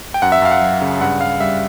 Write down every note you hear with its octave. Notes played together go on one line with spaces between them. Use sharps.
G5
F#2 F#5
E5
F#2 F5
F#5
F#3
C#3
G2 F#5
G2 F5
G3 E5